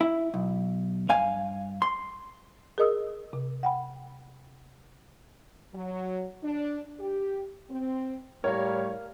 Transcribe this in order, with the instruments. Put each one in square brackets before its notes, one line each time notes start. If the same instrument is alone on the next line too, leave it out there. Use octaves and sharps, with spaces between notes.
[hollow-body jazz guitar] E4
B1
G2 F5 G#5
C6
[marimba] G#4 A#4 D#5 D#6 E6
C3
F#5 G5 B5
[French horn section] F#3
D4
G4
C4
[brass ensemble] A2 G3 [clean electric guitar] A#4 F5 [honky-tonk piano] C#5